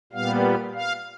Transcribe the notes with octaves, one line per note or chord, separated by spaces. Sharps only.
A#2 G3 B3 F5
F5